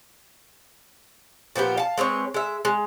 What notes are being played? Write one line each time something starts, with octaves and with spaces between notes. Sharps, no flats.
A#2 F3 B3 G4
F5 A5
G#3 C4 B4 C#5
G#3 E5
G#3